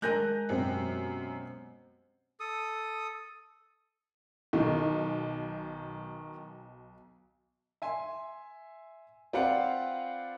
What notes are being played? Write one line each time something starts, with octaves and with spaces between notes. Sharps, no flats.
G#3 A#4 G#5 F#6 G6 A#6
F#2 B2 C4 G4
A4 D#6
B1 D#3
E5 G#5 C6
C4 F4 B4 D5 F5 F#5